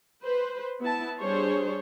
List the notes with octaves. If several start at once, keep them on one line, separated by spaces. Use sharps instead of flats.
B4 C5
B3 E4 A5
G3 D4 G#4 C5 C#5